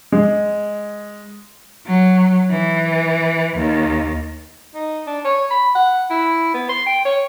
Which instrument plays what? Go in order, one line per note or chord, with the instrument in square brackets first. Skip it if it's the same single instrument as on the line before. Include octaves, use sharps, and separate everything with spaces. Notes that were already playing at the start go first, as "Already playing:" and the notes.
[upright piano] G#3
[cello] F#3
E3
D#2
[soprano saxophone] D#4
D4
C#5
B5
F#5
E4
B3
C6
G5
C#5